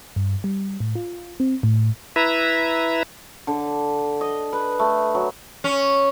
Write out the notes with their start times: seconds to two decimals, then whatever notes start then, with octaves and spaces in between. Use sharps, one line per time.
0.16 G2
0.44 G3
0.80 A2
0.95 F4
1.40 C4
1.63 A2
2.16 E4 B4 E5 A#5
3.47 D3
4.21 D#5
4.53 B4
4.79 A3
5.15 F#3
5.64 C#4